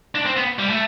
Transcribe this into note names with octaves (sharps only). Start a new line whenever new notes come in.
D4
C4
B3
G3
A3